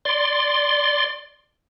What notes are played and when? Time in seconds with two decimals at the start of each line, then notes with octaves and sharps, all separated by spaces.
0.05 D5 C6